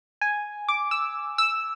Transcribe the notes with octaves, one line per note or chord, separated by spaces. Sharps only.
G#5
D6
E6
E6